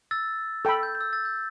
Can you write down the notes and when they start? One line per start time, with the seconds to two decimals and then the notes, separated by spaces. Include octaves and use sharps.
0.11 E6 A6
0.65 A4 G5 B5
0.83 G6
0.95 G6
1.01 E6 A6
1.13 E6 A6
1.25 G6